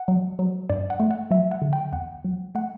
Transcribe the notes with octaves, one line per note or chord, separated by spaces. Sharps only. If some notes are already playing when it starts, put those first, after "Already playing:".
Already playing: F#5
F#3
F#3
G2 D5
F#5
A3
F#5
F#3 E5
F#5
D3
G5
E2 F#5
F#3
A3 F#5